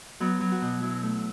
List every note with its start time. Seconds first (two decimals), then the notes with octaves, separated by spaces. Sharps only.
0.20 F#3 B3
0.41 F#3
0.52 F#4
0.62 B2
0.82 F#3 E4
1.02 A3